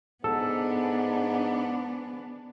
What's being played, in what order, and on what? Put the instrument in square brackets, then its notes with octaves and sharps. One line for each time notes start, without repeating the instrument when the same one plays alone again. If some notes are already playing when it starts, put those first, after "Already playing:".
[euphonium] G#2 [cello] B3 D4 [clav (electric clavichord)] A4